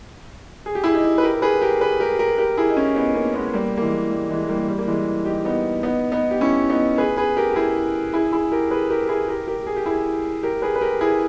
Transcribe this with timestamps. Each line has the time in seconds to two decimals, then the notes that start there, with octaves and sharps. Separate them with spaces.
0.66 G#4
0.75 G4
0.84 E4 G#4
0.94 D#4 G4
1.18 B4
1.23 G4 A#4
1.42 G#4 B4
1.61 G4 A#4
1.81 G#4 B4
2.00 G4 A#4
2.19 G4 A#4
2.38 G4 A#4
2.57 E4 G#4
2.70 D#4
2.76 C#4 E4
2.96 B3 D#4
3.15 A#3 C#4
3.34 G#3 B3
3.53 G3 A#3
3.77 A#3
3.82 E3 G#3
4.11 G3
4.29 E3 G#3
4.49 G3 A#3
4.69 G3
4.78 A#3
4.87 E3 G#3
5.26 D#4 G4
5.45 B3 D#4
5.83 B3 D#4
6.12 B3 D#4
6.31 G4
6.41 C#4 E4
6.70 B3 D#4
6.98 G#4 B4
7.17 G#4 B4
7.37 G4 A#4
7.50 G4
7.56 E4 G#4
8.13 E4 G#4
8.32 E4 G#4
8.52 G4 A#4
8.71 G#4 B4
8.90 G4 A#4
9.09 E4 G#4
9.28 G4 A#4
9.47 G4 A#4
9.67 G#4
9.76 G4
9.86 E4 G#4
10.43 G4 A#4
10.62 G#4 B4
10.76 B4
10.81 G4 A#4
11.01 E4 G#4